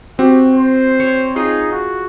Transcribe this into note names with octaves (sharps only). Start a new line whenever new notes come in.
C4 F#4 G4
C5
C#5
D#4 F4 G#4
F#4